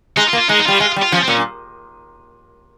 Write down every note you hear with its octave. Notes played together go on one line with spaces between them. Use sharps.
G#3 D#4
F4
A#3
F4
G#3 D#4
D#4
G3 F4
G#3 F4
G3
F4
F3 C#4
C4
A#2 C#4